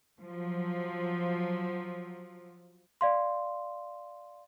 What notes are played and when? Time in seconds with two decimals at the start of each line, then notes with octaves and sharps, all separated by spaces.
0.21 F3 F#3
3.01 D5 F5 C6